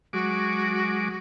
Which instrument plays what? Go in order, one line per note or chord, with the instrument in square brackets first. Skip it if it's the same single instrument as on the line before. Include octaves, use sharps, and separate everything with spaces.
[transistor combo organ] F#3 G#3 D6 [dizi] F#4